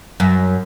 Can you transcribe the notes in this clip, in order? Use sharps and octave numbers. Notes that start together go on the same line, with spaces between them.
F#2